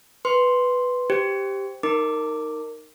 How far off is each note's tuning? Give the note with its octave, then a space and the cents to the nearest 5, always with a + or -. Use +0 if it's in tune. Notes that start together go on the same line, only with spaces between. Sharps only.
B4 +0 C6 +0
G4 +0 C5 -5
D#4 +0 A#4 -15 D6 +0